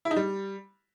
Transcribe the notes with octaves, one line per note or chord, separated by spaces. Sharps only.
E4
D#4
G3